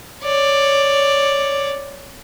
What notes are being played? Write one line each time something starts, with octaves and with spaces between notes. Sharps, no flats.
C#5 D5